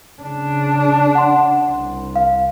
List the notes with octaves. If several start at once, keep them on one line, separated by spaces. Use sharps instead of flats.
C#3 D4
F#5 C6
C2
F5